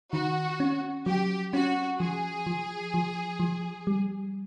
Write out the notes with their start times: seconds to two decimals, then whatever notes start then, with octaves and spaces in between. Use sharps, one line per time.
0.13 D#3 F#4
0.60 C#4
1.06 F#3 G4
1.53 C#4 F#4
2.00 F3 G#4
2.47 F3
2.94 F3
3.40 F3
3.87 G3